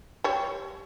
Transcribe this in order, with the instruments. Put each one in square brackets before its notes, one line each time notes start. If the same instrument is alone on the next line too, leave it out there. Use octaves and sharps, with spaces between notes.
[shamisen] G3 C#5